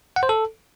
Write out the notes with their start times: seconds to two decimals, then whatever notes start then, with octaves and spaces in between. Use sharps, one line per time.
0.16 F#5
0.23 C5
0.29 A4